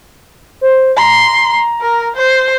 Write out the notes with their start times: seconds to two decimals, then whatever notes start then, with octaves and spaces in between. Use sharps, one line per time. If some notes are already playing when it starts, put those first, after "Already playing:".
0.61 C5
0.97 A#5 C6
1.81 A#4
2.16 C5